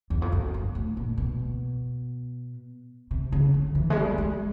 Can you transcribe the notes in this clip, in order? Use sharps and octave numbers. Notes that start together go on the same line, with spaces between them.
E2
F2
F#2
G2
A2
A#2
B2
C3
C#3
D3
E3
G#3
G3
G#3